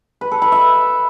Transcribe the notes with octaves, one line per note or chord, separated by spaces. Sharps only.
B4
A4
B5
E5